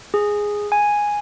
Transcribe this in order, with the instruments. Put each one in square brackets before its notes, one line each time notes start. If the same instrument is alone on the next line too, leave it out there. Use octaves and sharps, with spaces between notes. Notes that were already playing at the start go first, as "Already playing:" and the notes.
[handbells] G#4
G#5